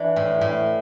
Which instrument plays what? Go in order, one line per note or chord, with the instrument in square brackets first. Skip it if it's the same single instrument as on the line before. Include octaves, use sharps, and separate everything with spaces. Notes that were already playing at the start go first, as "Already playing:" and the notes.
Already playing: [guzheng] E3 D4
A2
A2